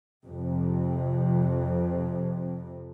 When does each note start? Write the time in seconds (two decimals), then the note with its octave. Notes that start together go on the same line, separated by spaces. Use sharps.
0.24 F2 C3